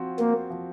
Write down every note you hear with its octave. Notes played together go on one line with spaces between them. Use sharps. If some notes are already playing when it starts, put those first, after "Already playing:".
Already playing: F3 C4 F#4
A#3 C5
F3